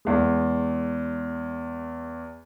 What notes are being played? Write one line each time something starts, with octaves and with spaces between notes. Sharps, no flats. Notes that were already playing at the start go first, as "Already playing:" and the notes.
E2 G#3